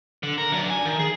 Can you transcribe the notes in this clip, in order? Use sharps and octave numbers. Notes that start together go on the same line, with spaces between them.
D3
A#4
F#3 D4
G#5
D#3
G#4